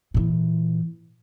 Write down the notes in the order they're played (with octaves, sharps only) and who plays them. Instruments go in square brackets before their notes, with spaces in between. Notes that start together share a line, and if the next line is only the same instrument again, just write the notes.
[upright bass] A#2 E3